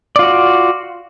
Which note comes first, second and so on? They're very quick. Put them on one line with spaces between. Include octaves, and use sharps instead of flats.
D5 F4 F#4